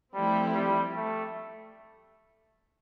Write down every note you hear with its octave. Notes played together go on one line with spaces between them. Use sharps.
F3 G3 A3 C4 E4 G4
G3
A3